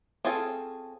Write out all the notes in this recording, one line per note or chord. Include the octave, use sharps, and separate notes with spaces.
C4 C#4 F4 G#4 A4